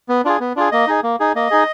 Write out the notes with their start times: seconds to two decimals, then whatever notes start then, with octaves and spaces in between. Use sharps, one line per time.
0.09 B3
0.25 D4 F4 G#4
0.40 B3
0.56 D4 F4 G#4
0.72 A#3 D#5
0.87 D#4 G#4
1.03 A#3
1.20 D#4 G#4
1.35 A#3 D#5
1.51 D#4 G#4